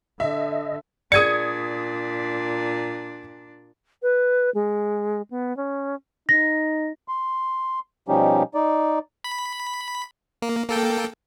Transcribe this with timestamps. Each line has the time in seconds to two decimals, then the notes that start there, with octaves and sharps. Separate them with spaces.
0.20 D3 D#5 E5
1.12 A#2 D4 G#4 D5 D#6 G#6 C#7
4.02 B4
4.54 G#3
5.30 B3
5.57 C#4
6.29 D#4 A#6
7.08 C6
8.08 B2 F3 G3 C#4 D#4 G4
8.54 D#4 D5
9.24 B5
10.42 A#3
10.69 A#3 A4 G5